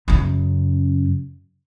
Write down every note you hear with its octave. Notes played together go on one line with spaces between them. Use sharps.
F#2 C#3